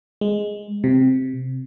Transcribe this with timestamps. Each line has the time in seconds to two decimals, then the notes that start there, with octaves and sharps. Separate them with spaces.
0.21 G#3
0.84 C3